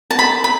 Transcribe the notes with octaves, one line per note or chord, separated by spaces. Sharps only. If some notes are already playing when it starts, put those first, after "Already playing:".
A5
B5
B5